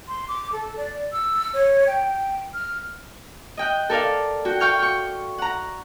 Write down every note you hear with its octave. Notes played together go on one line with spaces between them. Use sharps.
C6
D6
A4
D5
E6
C#5
G5
F6
D#5 G5 F#6
A4 A#4 D5 F5
F#4 G5
F5 G5 C#6 F6 G6
G5 C#6
F#5 A#5